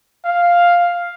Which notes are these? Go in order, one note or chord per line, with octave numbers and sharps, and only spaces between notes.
F5